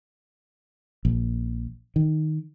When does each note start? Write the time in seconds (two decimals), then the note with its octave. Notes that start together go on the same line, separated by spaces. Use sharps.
1.05 A#1
1.96 D#3